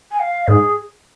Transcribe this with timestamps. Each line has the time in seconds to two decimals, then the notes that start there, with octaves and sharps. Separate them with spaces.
0.11 G#5
0.20 F5
0.48 G#2 G#4